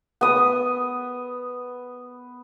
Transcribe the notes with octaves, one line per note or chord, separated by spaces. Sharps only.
B3 D#6